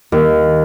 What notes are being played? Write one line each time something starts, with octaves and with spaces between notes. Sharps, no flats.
D#2